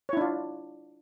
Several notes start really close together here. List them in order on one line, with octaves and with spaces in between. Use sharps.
C#5 E4 D4 F4